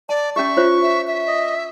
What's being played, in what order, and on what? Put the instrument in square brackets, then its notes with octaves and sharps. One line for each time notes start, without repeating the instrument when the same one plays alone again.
[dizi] D5 [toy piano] A5
[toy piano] C#4 G4 [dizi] E5 [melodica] C#6
[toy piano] F4 C5 C#5
[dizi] E5
E5
[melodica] D#5